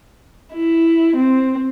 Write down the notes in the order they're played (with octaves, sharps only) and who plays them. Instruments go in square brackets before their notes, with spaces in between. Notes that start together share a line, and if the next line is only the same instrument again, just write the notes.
[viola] E4
C4